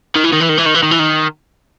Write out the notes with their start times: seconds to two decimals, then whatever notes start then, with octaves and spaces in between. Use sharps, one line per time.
0.15 D#3
0.24 E3
0.32 D#3
0.40 E3
0.49 D#3
0.57 E3
0.65 D#3
0.74 E3
0.83 D#3
0.91 E3
0.99 D#3